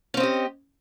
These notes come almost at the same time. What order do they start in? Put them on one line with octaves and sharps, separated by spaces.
C#4 C4 D#5 G4